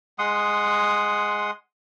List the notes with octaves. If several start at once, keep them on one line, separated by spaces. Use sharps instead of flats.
G#3 F#5 C6 D#6